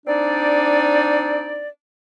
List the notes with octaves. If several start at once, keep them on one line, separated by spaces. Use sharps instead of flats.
C4 D4 D#4 D5